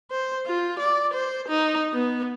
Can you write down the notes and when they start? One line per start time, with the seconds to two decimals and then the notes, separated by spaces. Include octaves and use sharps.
0.11 C5
0.46 F4
0.79 D5
1.13 C5
1.49 D#4
1.93 B3